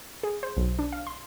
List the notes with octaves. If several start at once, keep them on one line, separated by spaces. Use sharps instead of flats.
G#4
C5
B1
D4
F5
C6